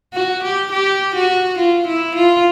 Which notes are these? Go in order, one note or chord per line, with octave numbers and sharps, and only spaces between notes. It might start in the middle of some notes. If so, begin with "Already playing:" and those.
F#4
G4
G4
F#4
F4
E4
F4